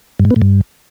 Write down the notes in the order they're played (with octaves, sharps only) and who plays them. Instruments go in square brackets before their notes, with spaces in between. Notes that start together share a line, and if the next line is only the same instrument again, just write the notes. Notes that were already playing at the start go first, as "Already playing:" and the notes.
[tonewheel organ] G2
G#2
B3
A2
G2